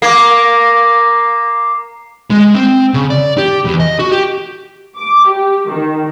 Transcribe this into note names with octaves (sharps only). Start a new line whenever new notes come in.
A#3 D6 C7
G#3
C4
C#3
D5
G4
E2
D#5
F#4
G4
D6
G4
D#3